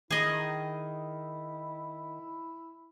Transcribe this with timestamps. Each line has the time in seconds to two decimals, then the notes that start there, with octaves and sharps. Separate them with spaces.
0.11 D#3 E4 G#4 D#5